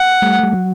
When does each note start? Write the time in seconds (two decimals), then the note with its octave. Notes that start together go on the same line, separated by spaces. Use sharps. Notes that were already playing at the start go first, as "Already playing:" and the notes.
Already playing: F#5
0.22 G3 A3
0.43 G3
0.53 F#3